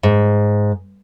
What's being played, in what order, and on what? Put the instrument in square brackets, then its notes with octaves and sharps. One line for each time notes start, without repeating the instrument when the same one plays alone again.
[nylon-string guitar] G#2